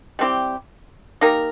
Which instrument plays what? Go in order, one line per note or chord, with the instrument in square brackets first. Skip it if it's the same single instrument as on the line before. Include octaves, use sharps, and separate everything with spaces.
[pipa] G3 C4 E4 G4
A#3 D#4 G4 A#4